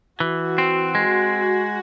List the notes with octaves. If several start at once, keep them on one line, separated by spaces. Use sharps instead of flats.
E3 F#4
C4
G#3